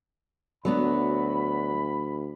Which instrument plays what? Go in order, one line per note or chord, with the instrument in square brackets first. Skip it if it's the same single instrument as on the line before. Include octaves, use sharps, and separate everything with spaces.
[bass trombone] D2 [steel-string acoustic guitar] F#3 B3 D4 [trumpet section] B5